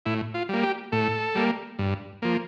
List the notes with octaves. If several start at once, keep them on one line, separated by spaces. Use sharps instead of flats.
A2 E4
F4
G3 A#3
G4
A2 A4
G3 A#3
G2
F3 A#3